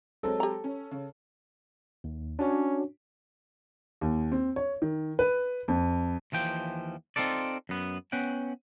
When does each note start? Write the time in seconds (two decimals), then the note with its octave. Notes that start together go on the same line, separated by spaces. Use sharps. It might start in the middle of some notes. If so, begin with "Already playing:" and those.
0.23 F#3 G#3 C4 A4
0.40 G4 A#5
0.64 C#4
0.91 C#3
2.04 D#2
2.39 C#4 D4 F#4 C#5
4.01 D#2
4.32 C4
4.56 C#5
4.82 D#3
5.19 B4
5.68 F2
6.32 D#2 E3 F3 G5
7.16 C4 D#4 F4 A4 D5
7.69 F#2 B3
8.12 B3 C#4 F#5 G5